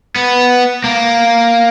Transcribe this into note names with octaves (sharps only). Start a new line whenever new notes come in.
B3
A#3